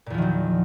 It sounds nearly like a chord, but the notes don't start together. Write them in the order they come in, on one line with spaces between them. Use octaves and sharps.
A#2 E2 F3 D#3 F#3